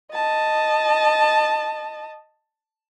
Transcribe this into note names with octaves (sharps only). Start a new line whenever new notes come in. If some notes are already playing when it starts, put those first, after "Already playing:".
D#5 A5